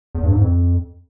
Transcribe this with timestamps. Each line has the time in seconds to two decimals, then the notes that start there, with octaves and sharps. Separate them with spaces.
0.15 E2
0.23 G2
0.32 G#2
0.41 F2